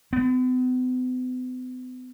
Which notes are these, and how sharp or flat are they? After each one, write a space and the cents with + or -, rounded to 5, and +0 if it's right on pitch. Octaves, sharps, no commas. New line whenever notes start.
B3 +45